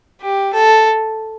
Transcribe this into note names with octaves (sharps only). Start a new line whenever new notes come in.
G4
A4